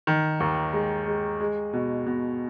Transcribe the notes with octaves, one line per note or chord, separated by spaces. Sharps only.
D#3
D#2
G#3
G#3
G#3
B2
B2